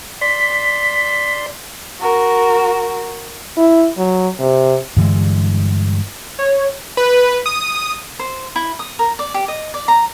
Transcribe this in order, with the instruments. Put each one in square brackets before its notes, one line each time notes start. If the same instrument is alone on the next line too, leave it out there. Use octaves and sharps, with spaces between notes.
[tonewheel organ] D5 C6 [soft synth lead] B6
[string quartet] F#4 A#4
[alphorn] E4
F#3
C3
[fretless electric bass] G2 D3 E3 G#3
[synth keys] C#5
[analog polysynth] B4
D#6
[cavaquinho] C5
E4
D#6
A#4
D5
G4
D#5
D5
A#5